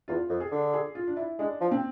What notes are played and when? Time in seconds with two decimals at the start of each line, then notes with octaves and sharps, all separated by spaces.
0.08 E2 F4
0.29 F2
0.40 G#4
0.51 D3
0.74 G#4
0.95 F4
1.07 D4
1.16 E4
1.39 G#3 D4
1.61 F3
1.71 C4